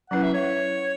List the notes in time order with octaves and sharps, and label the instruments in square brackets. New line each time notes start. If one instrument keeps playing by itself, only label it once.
[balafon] F#3 C#4 E4 B4 [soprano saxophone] F#5
[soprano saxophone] E5
C#5